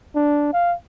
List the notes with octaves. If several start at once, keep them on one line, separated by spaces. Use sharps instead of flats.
D4
F5